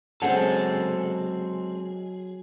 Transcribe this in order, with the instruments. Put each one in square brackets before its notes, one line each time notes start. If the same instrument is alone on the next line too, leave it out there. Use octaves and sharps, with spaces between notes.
[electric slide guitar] F#3 G#4 [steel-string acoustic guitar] G#3 C4 [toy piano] C#4 F#5 A5 [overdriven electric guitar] A4